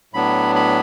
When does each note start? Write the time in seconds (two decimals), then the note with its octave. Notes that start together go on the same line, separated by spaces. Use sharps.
0.13 A2 F#3 B3 D4 B5
0.55 B5